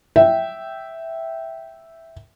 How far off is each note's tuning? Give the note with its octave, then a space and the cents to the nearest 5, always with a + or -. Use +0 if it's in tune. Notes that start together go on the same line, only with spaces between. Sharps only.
E5 +0 G5 -10